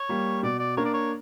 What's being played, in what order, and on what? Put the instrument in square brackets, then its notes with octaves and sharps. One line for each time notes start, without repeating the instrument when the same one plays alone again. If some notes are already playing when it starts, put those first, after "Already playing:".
Already playing: [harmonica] C#5
[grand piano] G3 A#3
[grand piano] B2 [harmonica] D5
[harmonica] D5
[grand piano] A#3 D4 A#4 [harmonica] C#5
[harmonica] D5
C#5